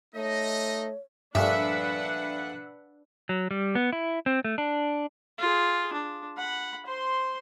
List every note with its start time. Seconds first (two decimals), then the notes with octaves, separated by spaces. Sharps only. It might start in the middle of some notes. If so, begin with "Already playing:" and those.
0.15 A3 D#4 C#5 D#5
1.35 A#1 G2 A#2 A3 D4 B4 E5 F#5
3.29 F#3
3.51 G3
3.75 B3
3.93 E4
4.26 C4
4.45 A3
4.58 D4
5.38 F4 G#4
5.93 D4
6.37 F#5 B5
6.86 C5 C6